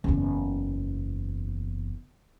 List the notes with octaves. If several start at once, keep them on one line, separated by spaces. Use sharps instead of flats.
F#1 E2